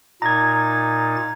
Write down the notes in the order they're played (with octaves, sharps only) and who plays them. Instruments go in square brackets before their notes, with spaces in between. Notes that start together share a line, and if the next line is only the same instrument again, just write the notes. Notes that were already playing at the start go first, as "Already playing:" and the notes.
[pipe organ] A#2 D#4 A6 [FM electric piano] A#5 G#6